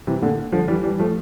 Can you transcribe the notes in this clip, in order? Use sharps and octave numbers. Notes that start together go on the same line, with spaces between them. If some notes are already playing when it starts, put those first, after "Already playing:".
C3 E3
A#2 D3
D3 F3
E3 G3
E3 G3
F3 A3